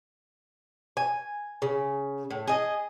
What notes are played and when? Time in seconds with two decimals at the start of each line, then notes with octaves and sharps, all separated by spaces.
0.97 G#5
1.62 C#3
2.30 A2
2.47 G#4 D#5